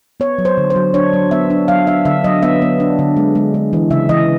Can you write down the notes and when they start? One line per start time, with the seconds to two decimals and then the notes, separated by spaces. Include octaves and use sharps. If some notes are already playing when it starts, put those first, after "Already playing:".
0.20 B3 C#5
0.38 F#3
0.45 C5
0.58 D3
0.70 C5
0.76 F#3
0.94 D4 C#5
1.14 F#3
1.31 B3 E5
1.50 D4
1.68 F#3 F5
1.87 D4 E5
2.05 D3 E5
2.24 F#3 D#5
2.43 B3 E5
2.62 B3
2.80 D4
2.99 D3
3.17 G#3
3.35 G#3
3.54 G#3
3.73 E3
3.90 C#3 E5
4.09 E3 D#5